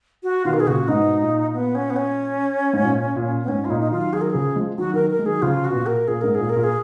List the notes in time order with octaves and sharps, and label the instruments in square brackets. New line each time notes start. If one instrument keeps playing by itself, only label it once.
[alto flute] F#4
[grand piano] B2 D#3 [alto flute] F4
[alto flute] A#4
[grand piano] B2 [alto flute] G#4
[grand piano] A#2 C#3 [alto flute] F#4
[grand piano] G#2 B2 [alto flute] D#4
[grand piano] A#2
[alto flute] B3
C#4
B3
C#4
[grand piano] G#2
A#2
A#2
[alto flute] B3
[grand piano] G#2 [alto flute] C#4
[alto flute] F4
[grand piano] A#2 [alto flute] D#4
[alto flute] D#4
[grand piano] D#3 F#3 [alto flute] F4
[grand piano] D#3 F#3 [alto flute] G#4
[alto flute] A#4
[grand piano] C#3 F3 [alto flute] G#4
[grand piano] F3 G#3
[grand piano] D#3 F#3 [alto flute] F#4
[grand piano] D#3 F#3 [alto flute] A#4
[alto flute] A#4
[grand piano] G#3
[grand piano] D#3 F#3 [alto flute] G#4
[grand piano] C#3 F3 [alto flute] F4
[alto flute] F#4
[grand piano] B2
A#2
[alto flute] A#4
[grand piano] A#2 [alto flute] G#4
[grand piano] G#2 [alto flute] A#4
[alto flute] G#4
[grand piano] A#2
[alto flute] A#4
[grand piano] A#2
[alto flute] G#4